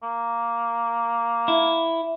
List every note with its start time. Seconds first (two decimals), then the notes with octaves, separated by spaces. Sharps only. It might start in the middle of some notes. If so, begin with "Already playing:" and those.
0.03 A#3
1.48 E4